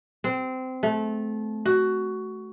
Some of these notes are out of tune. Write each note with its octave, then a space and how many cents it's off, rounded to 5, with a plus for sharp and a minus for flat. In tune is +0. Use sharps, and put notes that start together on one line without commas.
C4 -20
A3 -25
F#4 +15